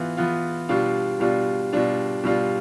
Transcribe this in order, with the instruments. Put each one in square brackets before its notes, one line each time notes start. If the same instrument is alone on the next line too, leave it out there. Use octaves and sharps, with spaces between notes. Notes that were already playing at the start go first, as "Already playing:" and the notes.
Already playing: [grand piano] E3 B3 F4
E3 B3 F4
B2 G3 D4 F4
B2 G3 D4 F4
B2 G3 D4 F4
B2 G3 D4 F4